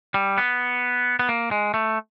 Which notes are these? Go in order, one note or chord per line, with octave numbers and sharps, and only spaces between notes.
G3
B3
B3
A#3
G#3
A3